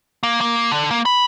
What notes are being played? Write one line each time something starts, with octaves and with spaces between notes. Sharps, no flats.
A#3
A#3
D3
A#3
B5